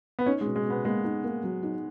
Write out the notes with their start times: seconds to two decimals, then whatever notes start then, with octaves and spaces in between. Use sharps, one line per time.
0.19 B3
0.26 C#4 D#4
0.41 G#3
0.46 B2
0.56 G#3
0.65 B2
0.70 B3
0.85 G#3 A#3
1.04 D#4
1.24 A#3
1.44 F#3
1.63 D#4